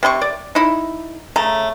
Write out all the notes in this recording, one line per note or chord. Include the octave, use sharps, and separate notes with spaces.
C3 C4 C6 C#6
D5
D#4 E4
C#3 A3 A#5